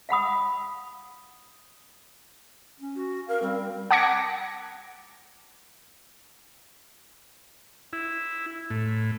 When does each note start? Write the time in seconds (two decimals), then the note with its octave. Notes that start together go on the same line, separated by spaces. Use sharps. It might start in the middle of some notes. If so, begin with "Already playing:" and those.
0.09 F5 F#5 B5 D#6
2.80 C#4
2.96 F#4
3.28 A#4 F5
3.42 G3 C4
3.91 F#5 A5 D6 G#6 A#6 C#7
7.93 E4
8.70 A2